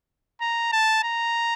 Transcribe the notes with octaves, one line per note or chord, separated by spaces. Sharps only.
A#5
A5
A#5